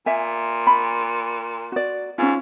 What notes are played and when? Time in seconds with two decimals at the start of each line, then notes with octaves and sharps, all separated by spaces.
0.06 A#2 E5 G#5
0.67 B5
1.72 F#4 D5
2.18 G#2 C#4 F4